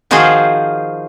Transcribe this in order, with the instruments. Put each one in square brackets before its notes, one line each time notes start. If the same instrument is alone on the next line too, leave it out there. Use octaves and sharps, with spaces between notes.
[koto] D#3 F3 F4 F#4 G#4 C5